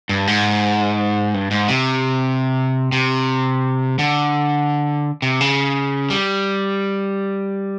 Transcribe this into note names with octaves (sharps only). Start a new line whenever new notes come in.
G2
G#2
G2
G#2
C3
C3
D3
C3
C#3
G3